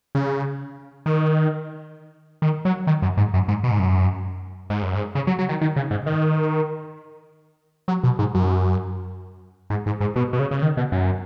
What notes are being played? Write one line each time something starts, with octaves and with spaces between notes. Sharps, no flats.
C#3
D#3
D#3
F#3
D#3
F#2
G#2
F#2
G#2
B2
G#2
F#2
G#2
F#2
G#2
C#3
F#3
F#3
D#3
D#3
C#3
G#2
D#3
F#3
B2
G#2
F#2
G#2
G#2
G#2
B2
B2
C#3
C#3
D#3
B2
F#2